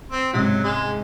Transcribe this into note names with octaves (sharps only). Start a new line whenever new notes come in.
C4
G#2 C3 F#3
G#3